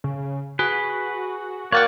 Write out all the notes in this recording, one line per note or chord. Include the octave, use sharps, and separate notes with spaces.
C#3
F#4 G#4 B4
A#3 C#5 D5 F#5 G5 F#6